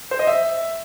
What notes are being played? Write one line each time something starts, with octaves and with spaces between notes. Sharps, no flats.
C5
D#5
E5